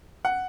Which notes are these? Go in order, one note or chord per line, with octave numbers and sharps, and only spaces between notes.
F#5